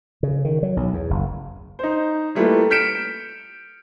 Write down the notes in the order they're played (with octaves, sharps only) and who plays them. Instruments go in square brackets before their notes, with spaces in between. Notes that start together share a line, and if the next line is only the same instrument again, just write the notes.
[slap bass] C#3
D#3
F#3
B1
E2
F#1
[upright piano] D#4 C5
G3 A3 A#3 E4 F4 B4
F6 G6 B6 C#7 D7 E7